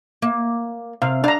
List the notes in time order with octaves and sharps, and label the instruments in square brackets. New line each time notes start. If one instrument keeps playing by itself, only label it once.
[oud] A#3
[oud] C3 [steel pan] F5
[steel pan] D4 A#5 [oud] F5